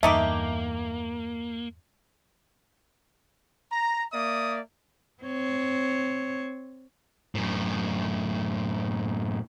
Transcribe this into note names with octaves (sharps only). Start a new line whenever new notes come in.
E2 G2 A3 A#3 D#4 G4 E5 D6
A#5
A#3 D5 E5 D#6
C4 C#5
F#2 A2